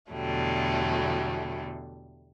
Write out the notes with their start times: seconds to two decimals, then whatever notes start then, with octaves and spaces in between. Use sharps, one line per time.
0.11 E2 B2 D3 F#3 G3 A3